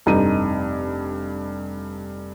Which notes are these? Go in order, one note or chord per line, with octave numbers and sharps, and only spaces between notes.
F1 G2 D#4 D#7